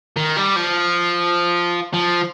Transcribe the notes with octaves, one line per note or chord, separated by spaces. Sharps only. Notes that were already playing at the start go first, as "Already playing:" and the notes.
D#3
G3
F3
F3